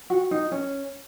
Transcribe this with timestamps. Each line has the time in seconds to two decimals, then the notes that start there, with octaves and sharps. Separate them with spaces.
0.10 F#4
0.31 D#4
0.52 C#4